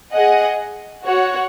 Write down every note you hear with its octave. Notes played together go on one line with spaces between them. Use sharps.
G#4 D#5 F#5
F#4 C#5 F#5